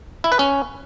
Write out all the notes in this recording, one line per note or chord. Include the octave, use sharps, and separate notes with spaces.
E4
B4
C#4